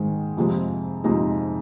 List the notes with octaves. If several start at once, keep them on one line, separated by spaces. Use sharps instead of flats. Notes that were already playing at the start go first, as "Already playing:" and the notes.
Already playing: G#2 D#3 G#3
F2 C3 F3 G#3
F2 C3 F3 G#3 D#4